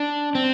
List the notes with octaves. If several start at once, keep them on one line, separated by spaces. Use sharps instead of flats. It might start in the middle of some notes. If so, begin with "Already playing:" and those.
Already playing: D4
C4